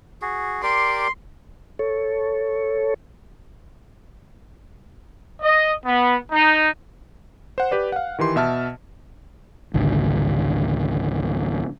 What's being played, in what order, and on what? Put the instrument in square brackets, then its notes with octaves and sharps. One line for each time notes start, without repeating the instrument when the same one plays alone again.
[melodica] F#4 G#4
[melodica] G4 A#4 D5 [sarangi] C6
[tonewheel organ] A4 C#5
[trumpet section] D#5
B3
D#4
[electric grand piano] C5 F#5
G4 B4 D5
F5 F#5
D#3 E3 G4 C6
B2 E5 A5 F6
[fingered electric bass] G#1 C#2 D3